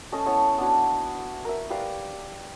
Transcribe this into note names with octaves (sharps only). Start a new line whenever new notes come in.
A3 C#4 D#5 A5
B3 E4 C#5 A5
B3 D4 F#4 G#5
A#4 E5
G4 B4 D5 F5